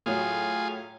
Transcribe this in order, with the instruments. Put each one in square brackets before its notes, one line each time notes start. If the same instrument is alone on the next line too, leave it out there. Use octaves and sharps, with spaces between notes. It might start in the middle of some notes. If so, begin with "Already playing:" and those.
[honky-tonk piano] A2 F#3 [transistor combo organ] F4 G#4